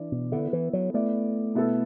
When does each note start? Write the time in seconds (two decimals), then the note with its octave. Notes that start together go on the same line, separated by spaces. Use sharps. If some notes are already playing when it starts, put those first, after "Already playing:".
Already playing: E3 D4 D5
0.12 B2
0.32 D3 B3 E4 A4 E5
0.53 E3
0.73 F#3
0.94 A3 B3 E4 D5
1.55 B2 B3 E4 A4